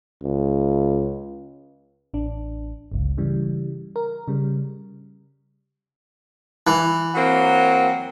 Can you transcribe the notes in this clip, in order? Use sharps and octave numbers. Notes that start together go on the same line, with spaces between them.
C#2
A1 D4
G1 C#2
C#3 E3 G3
A#4
C#3 G3
E3
F#3 A#3 C4